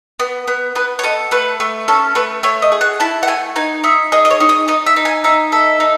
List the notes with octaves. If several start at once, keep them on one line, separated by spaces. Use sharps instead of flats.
B3
B3
B3 B4
C#5
A4 D#5
A3 B4
A3
C#4 A4
A3 B4
A3 C#5
D#5
G#4
F#5
E4 A5
F#5
A3 G#5
D#4 G#5
D#4 E5
G#4 D#5
D#5
C#5
D#4
D#5
D#4 D#5
E5
D#4
G#5
D#4 E5
A4 E5
D#4